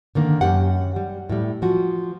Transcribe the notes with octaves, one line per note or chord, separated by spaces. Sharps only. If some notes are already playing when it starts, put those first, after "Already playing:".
D3 D#3 A#3
F#2 G4 F#5
G3
A2 G3
F3 F#4